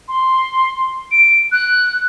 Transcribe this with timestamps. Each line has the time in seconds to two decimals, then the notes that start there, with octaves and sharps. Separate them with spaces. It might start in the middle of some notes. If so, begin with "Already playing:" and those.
0.08 C6
1.12 D7
1.52 F#6